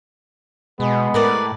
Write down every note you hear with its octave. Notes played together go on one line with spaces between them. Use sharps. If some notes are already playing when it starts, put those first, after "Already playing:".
B2 G#3 B3
A2 A#4 B4 D5